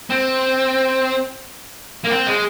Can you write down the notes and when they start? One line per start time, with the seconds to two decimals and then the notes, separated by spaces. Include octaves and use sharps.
0.10 C4
2.05 A#3
2.11 C4
2.27 G#3